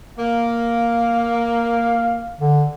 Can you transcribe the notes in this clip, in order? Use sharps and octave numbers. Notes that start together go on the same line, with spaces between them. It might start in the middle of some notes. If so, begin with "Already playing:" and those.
A#3 F5
D3